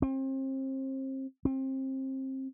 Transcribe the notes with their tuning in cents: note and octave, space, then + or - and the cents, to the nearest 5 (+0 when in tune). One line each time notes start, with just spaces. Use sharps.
C4 +35
C4 +25